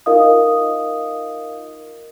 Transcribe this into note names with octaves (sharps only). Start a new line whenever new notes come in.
D#4 F4 A#4 D#5 F5 D#6